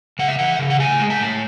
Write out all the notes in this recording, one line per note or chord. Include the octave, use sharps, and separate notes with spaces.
C#3 F#5
E5
E3 F#5
C#3
F#5
A2 G#5
G#3
A5
A2